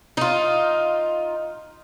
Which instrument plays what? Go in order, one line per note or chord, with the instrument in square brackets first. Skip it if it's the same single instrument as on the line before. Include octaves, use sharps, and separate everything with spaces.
[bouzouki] D#4 F4